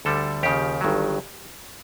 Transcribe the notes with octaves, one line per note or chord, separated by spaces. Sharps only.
D2 D3 G3 A4
D#2 C#3 F3 G4
G1 G2 D#3 F#3